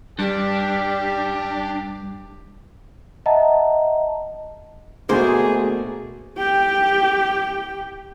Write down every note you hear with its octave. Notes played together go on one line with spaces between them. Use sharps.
G2 G3 D4 G4
D#5 E5 F#5 A5 A#5
D2 B2 A3 A#3 G#4 C5
G4 G5